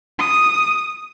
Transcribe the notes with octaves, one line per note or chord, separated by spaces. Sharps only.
D#6